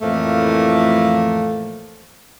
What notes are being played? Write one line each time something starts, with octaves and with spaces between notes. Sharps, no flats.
F2 A2 E3 F3 A3 A#3